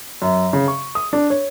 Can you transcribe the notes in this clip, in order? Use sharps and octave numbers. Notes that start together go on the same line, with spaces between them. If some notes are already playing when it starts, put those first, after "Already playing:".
F#2
C#3
C#6
D#6
D4
C#5